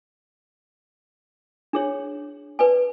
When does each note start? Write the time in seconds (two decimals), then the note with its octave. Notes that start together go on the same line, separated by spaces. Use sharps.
1.73 D4 G#4 C#5
2.59 B4 D5 G#5